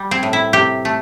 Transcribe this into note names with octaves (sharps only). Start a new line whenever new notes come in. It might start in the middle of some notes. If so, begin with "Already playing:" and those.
Already playing: G3
C4
A2
E4
C3 G4
A3